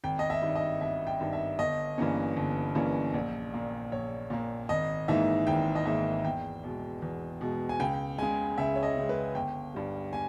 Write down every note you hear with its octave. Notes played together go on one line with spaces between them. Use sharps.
G#1 G5
D#5
E5
G2 D#3
D#5
G#1 E5
G5
G2 D#3
E5
G1 D#5
G2 E3 A#3 C#4
G1
G2 E3 A#3 C#4
A#1
A#2 A#3
A#1 C#5
A#2 A#3
G#1 D#5
G#2 E3 A#3 D#4 E5
G#1 G5
D#5
G#2 E3 A#3 D#4 E5
E2 G5
B2 G#3
E2
B2 G#3
G#5
C#2 G5
C#3 G#3 G#5
C#2 E5
C#5
D#5
C#3 G#3
B4
G1 G5
G2 G3
G#5